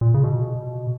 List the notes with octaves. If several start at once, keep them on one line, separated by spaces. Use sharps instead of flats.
A#2
C#3
B2